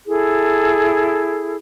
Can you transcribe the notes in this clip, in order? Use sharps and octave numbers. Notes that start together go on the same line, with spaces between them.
E4 G#4 A4